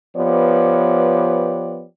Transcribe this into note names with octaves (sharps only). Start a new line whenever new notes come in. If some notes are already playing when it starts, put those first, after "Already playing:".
F3 B3 G4 B4 C#5 D5